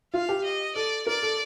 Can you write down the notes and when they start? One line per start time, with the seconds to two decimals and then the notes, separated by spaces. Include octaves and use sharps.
0.14 F4 F5
0.29 G4
0.44 D#5
0.75 A4 D5
1.07 A#4 D5
1.23 A4